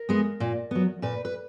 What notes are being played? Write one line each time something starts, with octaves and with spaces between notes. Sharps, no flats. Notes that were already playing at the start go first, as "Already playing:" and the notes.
Already playing: A#4
G#3 B3
A#2
F#3 B3
A#2 B4
B4